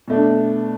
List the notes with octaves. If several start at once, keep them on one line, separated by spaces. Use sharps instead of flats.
B2 A3 D4